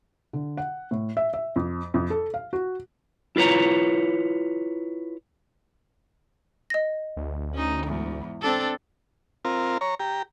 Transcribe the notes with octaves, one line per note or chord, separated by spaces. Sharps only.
D3
F#5
A2
E5
E5
F2
F2
A4
F5
F#4
E4 F4 B4 C#5 A#5
D#5 A#6
D2
C#4 D#4
E2 G#2
C4 D4 A4
C4 F4 A#4
C#5 A#5
G4 A#5